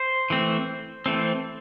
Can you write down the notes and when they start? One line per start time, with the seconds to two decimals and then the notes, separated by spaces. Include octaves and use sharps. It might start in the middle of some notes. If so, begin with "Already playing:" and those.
Already playing: C5
0.30 E3 A3 C4
1.06 E3 A3 C4